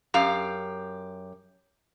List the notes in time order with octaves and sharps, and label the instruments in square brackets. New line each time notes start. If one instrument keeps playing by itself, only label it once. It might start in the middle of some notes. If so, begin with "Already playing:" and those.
[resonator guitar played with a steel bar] F#2 G4 F5